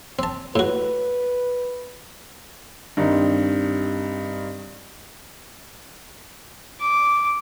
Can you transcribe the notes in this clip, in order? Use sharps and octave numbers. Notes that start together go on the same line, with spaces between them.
C4 A5
A2 F#4 B4
G2 D#3 C4 D#4
D6